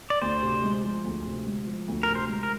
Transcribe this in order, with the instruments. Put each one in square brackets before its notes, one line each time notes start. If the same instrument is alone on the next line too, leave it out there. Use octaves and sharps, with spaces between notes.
[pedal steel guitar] D5
[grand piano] D2 [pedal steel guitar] C5
[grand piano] C3
G#3
F3
D2
C3
G#3
F3
D2
[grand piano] C3 [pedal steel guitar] A#4
[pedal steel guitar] C5
[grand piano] G#3
[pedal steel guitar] A#4